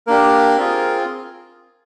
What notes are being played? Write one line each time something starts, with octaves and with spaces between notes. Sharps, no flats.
A#3 D4 G4 A#4
C4 F4 G#4